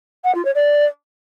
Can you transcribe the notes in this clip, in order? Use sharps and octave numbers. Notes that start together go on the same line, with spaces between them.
F#5
F4
C#5
D5